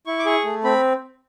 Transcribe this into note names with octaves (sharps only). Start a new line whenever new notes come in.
E4 C#6
D6
G#4 C#6
A3
C4 B5